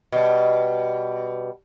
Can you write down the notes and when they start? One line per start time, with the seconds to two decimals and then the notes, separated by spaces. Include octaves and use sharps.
0.12 B2 G3